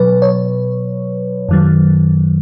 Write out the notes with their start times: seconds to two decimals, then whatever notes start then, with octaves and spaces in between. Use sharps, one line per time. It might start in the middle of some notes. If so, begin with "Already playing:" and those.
Already playing: B2 F#3 B4
0.22 C#5
1.49 F#2 D#3 F#3